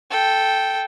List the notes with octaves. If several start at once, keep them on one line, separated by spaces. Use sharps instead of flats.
A4 G5